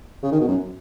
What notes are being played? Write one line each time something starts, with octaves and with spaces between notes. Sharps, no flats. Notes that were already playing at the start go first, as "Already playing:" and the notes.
C#3
D#3
B2
F#2